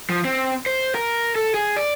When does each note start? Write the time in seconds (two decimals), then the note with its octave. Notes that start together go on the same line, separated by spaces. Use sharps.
0.10 F3
0.25 C4
0.66 C5
0.95 A#4
1.35 A4
1.54 G#4
1.77 D5